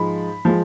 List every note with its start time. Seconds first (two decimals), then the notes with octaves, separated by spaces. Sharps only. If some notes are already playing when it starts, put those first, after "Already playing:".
Already playing: G#2 F3 G#3 B5
0.45 F3 G#3